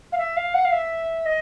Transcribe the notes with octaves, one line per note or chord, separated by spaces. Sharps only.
F5
E5
F5
F#5
F5
E5
D#5